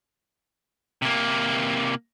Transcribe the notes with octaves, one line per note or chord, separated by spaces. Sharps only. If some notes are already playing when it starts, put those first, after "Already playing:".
C3 A#3